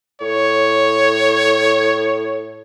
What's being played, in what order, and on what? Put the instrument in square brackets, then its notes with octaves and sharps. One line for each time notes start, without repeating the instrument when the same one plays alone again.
[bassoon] A2 [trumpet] C#5